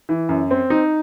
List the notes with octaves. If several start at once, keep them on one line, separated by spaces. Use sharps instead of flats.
E3
F#2
C4
D#4